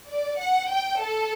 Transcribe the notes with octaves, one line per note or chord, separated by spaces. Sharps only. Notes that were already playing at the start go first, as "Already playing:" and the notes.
D5
F#5
G5
A4